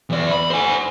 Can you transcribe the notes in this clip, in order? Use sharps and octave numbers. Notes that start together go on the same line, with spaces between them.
E2 D5
B5
C5 G#5